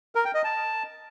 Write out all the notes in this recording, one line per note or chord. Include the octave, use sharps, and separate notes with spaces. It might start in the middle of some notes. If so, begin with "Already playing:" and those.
A#4
G5
D#5
A5